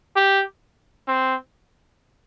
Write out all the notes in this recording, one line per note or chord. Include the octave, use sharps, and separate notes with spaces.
G4
C4